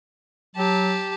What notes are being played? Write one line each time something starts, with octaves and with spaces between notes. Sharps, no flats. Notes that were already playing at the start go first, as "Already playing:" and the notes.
F#3 G4 A5